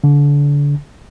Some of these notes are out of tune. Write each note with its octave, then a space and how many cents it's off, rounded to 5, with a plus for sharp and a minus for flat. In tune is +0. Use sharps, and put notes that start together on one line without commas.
D3 -30